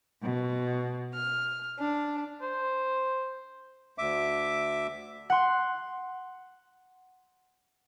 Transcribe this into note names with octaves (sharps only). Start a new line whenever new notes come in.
B2
F6
D4
C5
D2 E5 D6
F#5 C6